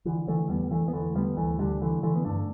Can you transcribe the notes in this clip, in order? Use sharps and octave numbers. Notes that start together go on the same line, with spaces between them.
D3 E3
D3 E3 A3
E2 G3 B3
E2 E3 A3
B3
D3 E3 A3
D3 G3 B3
D2 E3 A3
D2 D3 G3
D3 E3 A3
D3 E3 A3
B3
G2 A3 D4